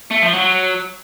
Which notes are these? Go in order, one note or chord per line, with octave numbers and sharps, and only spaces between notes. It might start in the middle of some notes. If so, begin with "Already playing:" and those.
A3
F3
F#3